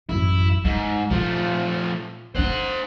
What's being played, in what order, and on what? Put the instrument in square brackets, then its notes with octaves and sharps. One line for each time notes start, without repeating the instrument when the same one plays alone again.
[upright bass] A1 F#2 [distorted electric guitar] E4
[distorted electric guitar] G#2 [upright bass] G#3
[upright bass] A#2 [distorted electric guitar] F3 A3
[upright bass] A#3 D4 [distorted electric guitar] C5 F#5